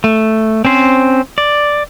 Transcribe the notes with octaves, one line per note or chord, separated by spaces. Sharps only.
A3
C4 C#4 C5
D5